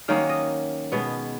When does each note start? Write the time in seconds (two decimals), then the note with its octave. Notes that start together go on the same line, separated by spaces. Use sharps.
0.08 D#3 F#3 A#3 C#4 F5
0.29 D#5
0.92 B2 G#3 B3